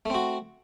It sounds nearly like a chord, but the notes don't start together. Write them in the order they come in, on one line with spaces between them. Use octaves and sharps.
A3 C4 F#4